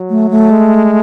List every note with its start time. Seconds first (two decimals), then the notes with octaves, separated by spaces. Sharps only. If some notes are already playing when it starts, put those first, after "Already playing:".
Already playing: F#3
0.10 A3
0.31 A3
0.50 G#3